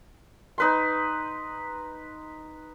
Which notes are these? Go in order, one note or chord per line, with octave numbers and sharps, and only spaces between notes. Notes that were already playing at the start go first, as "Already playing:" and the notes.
D#4 B4 C6